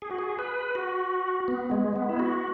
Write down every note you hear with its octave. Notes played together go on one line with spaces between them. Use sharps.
G#4
F#4
G#4
B4
F#4
B3
G#3
B3
E4
F#4